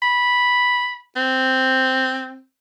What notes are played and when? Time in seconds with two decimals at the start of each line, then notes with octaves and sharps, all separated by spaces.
0.02 B5
1.16 C4